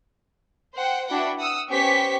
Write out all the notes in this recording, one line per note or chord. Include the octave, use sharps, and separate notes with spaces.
C5 F#5 G5
D4 E4 F#4 B4 F#5 G5
F#5 D#6 E6
B3 C#4 G4 C5 C#6 B6